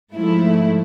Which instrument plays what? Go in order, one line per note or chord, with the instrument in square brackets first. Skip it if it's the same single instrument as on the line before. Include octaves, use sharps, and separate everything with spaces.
[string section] G#2 F3 A3 E4